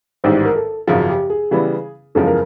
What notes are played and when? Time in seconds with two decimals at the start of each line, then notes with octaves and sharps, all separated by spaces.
0.24 A1 G#2 D#3 G3 C5
0.45 A#4
0.56 A4
0.88 G#1 F#2 C#3 F3 G#4
1.09 G4
1.30 G#4
1.51 C#3 E3 G3 B3 E4
2.15 F#1 E2 C#3 F3 G#3 A4
2.27 A#4